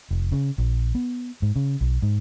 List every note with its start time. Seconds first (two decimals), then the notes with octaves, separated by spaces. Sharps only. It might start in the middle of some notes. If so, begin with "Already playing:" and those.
0.11 F1
0.32 C#3
0.58 A#1
0.95 B3
1.42 G#2
1.56 C#3
1.81 B1
2.02 G#2